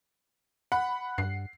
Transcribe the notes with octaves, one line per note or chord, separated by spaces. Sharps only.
F#5 B5
G2 C7